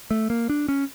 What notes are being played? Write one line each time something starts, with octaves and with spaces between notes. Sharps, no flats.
A3
A#3
D4
C#4